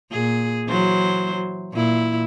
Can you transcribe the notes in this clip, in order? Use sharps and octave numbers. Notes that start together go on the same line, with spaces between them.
A#2 G#4
E3 F#3 C5
A#2 E4